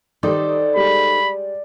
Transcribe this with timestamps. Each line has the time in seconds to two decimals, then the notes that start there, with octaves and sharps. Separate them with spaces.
0.23 D#3 G3 D#4 A4 C5 D5
0.76 G3 G#3 B5